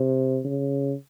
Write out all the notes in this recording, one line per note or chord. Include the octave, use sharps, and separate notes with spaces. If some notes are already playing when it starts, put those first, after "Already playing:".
Already playing: C3
C#3